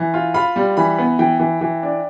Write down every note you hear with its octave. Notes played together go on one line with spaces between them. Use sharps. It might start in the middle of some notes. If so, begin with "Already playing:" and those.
Already playing: E3
F4
F4 B5
G3
E3 B5
B3
E3 G5
E3
E3
D4